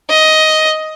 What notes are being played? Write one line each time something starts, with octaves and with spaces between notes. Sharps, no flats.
D#5